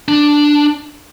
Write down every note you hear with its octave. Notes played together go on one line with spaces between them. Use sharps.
D4